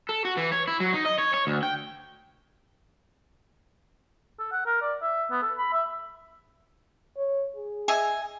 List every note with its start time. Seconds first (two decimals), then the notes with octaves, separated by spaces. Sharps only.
0.09 A4
0.25 F#4
0.37 E3
0.52 C#5
0.68 E4
0.80 F#3
0.93 D#4
1.05 D#5
1.18 C#5
1.34 C#5
1.47 D2
1.63 G5
4.39 A4
4.52 F#5
4.66 A#4
4.81 D5
5.02 E5
5.31 B3
5.43 A4
5.58 B5
5.73 E5
7.17 C#5
7.56 G#4
7.88 D#5 E5 G#5